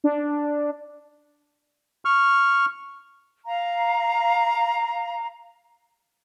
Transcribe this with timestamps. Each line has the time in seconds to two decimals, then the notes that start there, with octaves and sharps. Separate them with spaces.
0.04 D4
2.05 C#6 F6
3.45 F5 A#5